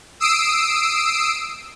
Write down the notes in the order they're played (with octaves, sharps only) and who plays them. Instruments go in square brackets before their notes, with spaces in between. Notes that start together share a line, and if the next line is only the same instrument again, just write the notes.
[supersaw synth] D#6 E6 C7 D7